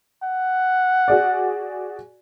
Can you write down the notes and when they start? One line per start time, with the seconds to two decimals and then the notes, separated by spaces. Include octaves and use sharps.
0.23 F#5
1.08 F#4 G#4 D5